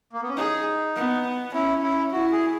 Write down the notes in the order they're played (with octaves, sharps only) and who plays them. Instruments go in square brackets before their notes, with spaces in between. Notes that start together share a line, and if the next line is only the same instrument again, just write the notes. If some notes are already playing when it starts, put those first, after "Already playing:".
[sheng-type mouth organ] A#3
B3
C#4
[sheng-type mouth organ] D#4 [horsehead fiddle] G#4
[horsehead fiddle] B3
[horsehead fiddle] C#4 [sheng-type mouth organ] E4
[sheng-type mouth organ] E4
[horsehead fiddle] E4 [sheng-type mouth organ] F#4
[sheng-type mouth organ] G#4